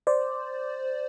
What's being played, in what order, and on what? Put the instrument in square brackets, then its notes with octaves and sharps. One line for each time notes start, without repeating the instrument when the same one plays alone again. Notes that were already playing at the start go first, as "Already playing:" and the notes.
[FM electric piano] C5 D5